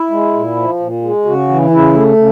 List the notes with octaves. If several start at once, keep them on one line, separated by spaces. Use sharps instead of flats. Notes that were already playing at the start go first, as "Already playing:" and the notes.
Already playing: E4
G#3
A#2
F3
A#2
G#3
C#3 F#4
E3
C#3 E4
A3
C#3